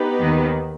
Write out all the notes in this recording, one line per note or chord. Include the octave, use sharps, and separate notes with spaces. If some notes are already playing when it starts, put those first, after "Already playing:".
Already playing: B3 D#4 G4 B4
D#2 D#3